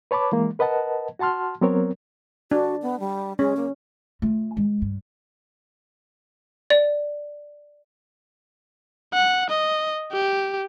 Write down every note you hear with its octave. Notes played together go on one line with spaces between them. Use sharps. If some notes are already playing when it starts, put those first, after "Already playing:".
B4 C#5 A5 B5 D6
E3 G#3 A#3
A#4 B4 D#5 F#5 A5
F#4 F#5 A5 C6 F6
F#3 B3 C4 A#4 C#5
D4 F#4
B3
G3
G#3 C#4
A#3
A3 F4
G#3
G2
D5
F#5
D#5
G4